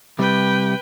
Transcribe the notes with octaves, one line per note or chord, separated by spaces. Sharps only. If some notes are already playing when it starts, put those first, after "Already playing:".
C3 G3 B4 G5